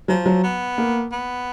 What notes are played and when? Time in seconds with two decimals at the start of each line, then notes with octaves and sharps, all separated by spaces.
0.08 F3 F#3
0.26 F#3
0.44 B3
0.78 A#3
1.12 B3